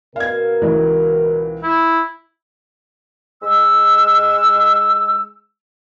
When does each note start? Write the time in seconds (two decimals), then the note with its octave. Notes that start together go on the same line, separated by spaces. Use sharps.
0.16 B2 A#4 F5 G#6
0.62 C#2 E3
1.63 E4
3.43 G#3 E6